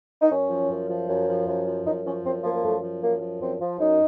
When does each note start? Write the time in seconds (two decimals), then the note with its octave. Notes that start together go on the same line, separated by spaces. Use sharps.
0.22 D#4
0.30 F#2 C#4
0.49 F3
0.69 F#2
0.88 F3
1.07 F#2
1.27 F3
1.46 F#2
1.66 F3
1.85 F#2 D#4
2.04 F3 C#4
2.24 F#2 C4
2.43 F3 A#3
2.54 A#3
2.63 F#2 A3
2.82 F3
3.01 F#2 A#3
3.21 F3
3.40 F#2 C4
3.60 F3
3.79 F#2 D#4